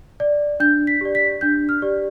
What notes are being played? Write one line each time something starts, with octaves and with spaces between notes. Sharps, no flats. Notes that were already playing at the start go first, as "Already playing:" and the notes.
D5
D4 G6
B6
G4 D5
B6
D4 G6
F6
G4 D5